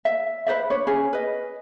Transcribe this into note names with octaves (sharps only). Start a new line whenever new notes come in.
E5
B4 C5 D5 E5
D4 B4 C#5
C#4 G#4
B4 D#5